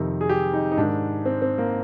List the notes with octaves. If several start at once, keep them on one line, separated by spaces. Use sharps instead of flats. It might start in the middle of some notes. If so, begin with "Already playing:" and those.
Already playing: F2 C3 D#3
G#4
G4
D#4
D#4
G#2 D#3 D4
C4
C4
A#3